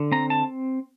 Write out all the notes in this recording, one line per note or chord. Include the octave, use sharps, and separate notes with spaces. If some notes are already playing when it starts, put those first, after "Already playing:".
Already playing: D3
C4 A#5
A5